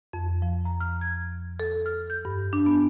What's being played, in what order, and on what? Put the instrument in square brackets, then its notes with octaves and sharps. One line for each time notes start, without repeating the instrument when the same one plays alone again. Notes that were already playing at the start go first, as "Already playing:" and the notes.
[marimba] F2
F3
A#5
F6
G#6
A4
F6
G6
G2
D4
B3